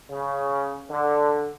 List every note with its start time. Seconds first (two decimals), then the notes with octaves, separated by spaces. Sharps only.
0.11 C#3
0.91 D3